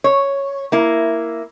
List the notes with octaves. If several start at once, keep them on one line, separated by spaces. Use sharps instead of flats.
C#5
A#3 E4